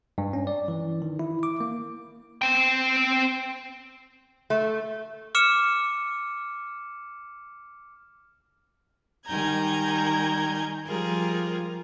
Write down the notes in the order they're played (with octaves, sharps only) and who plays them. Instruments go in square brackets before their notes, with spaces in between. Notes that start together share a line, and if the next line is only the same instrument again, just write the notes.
[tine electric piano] G2
C#4
D5
E3
D#3
E4
D6
A#3
[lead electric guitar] C4 G5
[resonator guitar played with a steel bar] A3
[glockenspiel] D6 F6 C#7 E7
[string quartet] D#3 G3 G#5 A#5 G6 G#6
F3 G3 F4 G#4 A#4